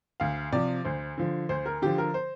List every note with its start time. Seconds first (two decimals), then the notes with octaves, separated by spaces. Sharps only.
0.20 D2 F5
0.52 C3 F3 D5
0.85 D2 C5
1.18 D3 F3
1.49 D2 C5
1.66 A#4
1.82 D3 F3 G4
1.98 A#4
2.14 C5